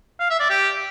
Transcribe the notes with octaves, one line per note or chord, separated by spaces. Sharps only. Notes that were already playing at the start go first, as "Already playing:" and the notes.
F5
E5
D5
G4